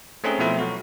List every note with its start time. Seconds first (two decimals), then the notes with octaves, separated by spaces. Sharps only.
0.24 A3 C4 C#4 D#4 G#4
0.39 B2 F3 A3 C4 E4
0.59 F#3 F#4